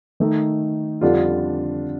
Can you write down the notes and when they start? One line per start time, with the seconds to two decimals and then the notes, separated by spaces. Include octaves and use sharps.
0.20 D#3 A3 D#4
1.01 F2 D3 G3 D4 F4